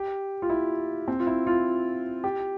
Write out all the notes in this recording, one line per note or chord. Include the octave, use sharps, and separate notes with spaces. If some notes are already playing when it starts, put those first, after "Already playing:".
Already playing: G4
F4
E4
C4
F4
E4
F4
G4